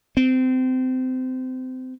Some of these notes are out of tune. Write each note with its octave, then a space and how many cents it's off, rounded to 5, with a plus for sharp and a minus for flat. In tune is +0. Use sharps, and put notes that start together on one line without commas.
C4 -25